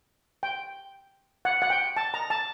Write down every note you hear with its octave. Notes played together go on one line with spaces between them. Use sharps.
G5
F#5
F#5
G5
A5
A#5
A5